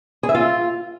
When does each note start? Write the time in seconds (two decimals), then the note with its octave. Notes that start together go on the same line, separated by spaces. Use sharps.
0.23 G#4
0.29 E5
0.35 F4